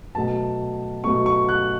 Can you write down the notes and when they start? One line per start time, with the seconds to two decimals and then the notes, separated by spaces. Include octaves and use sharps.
0.15 B2 F#3 A3 A5
1.04 B2 F#3 A3 C#6
1.26 C#6
1.49 F#6